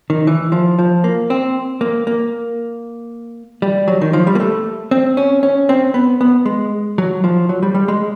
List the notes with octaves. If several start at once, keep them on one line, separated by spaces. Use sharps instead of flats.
D#3
E3
F3
F3
A#3
C4
A#3
A#3
G3
F#3
D#3
F3
G3
A#3
A3
C4
C#4
C#4
C4
B3
B3
G#3
F#3
F3
F#3
G3
G3
G#3